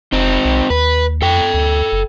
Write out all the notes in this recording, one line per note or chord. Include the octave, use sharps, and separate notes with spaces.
F1 C4 D#4
B1
D#2 B4
F2 A4 G5
D2
F#1